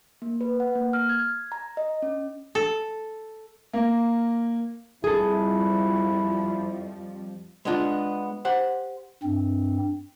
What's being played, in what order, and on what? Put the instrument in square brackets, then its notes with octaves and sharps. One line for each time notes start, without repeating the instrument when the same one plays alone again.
[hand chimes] A#3
B4
F#5
A#3
F6
G#6
A#5
D#5
C#4
[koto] A4
[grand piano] A#3
[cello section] F2 F3 G3 [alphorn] E4 [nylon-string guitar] G#4 A4
[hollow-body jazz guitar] G#3 B3 D4 F4
G4 C5 F#5
[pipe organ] G2 C4